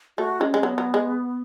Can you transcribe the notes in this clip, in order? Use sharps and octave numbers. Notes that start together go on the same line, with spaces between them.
A3 F#4
G#3 C#4
G#3
C#4
F#3 B3
F#3
G#3